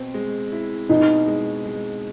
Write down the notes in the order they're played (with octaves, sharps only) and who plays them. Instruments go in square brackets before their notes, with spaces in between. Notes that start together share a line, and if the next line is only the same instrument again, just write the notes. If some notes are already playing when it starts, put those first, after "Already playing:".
Already playing: [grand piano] B2 C4
G#3
E4
[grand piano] B2 [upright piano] D#4
[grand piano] G#3
G#3